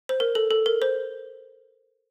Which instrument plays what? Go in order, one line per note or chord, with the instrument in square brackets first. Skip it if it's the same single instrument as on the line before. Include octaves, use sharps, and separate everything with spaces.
[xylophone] C5
A#4
A4
A4
A#4
C5